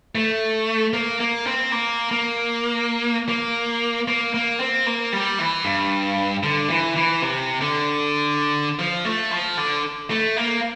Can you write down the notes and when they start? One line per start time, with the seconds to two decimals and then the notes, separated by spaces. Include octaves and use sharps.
0.15 A3
0.93 A#3
1.20 A#3
1.46 C4
1.72 A#3
2.11 A#3
3.29 A#3
4.08 A#3
4.34 A#3
4.60 C4
4.86 A#3
5.13 G3
5.39 E3
5.65 G2
6.43 D3
6.70 E3
6.96 E3
7.22 C3
7.61 D3
8.79 F3
9.05 A3
9.31 F3
9.58 D3
10.10 A3
10.36 A#3